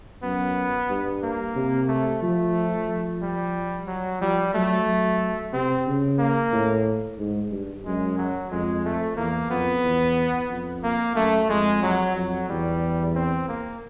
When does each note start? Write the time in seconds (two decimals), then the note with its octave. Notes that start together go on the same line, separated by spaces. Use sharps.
0.23 F#2 B3
0.90 G2
1.23 A#3
1.56 C3
1.89 A3
2.22 F3 A3
2.88 F3
3.21 G3
3.87 F#3
4.21 F3 G3
4.54 F#3 A3
4.87 F#3
5.53 C3 C4
5.87 C#3
6.19 A#3
6.52 A2
7.18 G#2
7.52 G2
7.85 F#2 G#3
8.18 F#3
8.51 F2 G#3
8.85 A3
9.17 E2 A#3
9.50 F2 B3
9.84 E2
10.50 F2
10.83 A#3
11.16 F#2 A3
11.49 F2 G#3
11.83 F#3
12.16 F2 F#3
12.49 E2 G3
13.15 C4
13.48 A#3